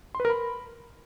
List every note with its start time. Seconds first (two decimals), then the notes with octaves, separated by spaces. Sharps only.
0.15 C6
0.20 B4
0.25 A#4
0.30 B5